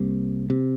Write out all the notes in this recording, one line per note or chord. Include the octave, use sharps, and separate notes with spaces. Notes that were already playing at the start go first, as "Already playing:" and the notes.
Already playing: C2 C3 G3 A#3
C3